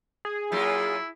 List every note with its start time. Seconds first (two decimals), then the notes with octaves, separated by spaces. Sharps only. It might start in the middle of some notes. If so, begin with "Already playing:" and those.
0.25 G#4
0.52 F#3 A#3 E4 F4